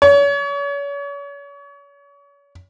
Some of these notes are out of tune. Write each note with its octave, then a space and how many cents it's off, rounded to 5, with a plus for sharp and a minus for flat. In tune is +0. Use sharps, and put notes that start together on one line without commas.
C#5 +40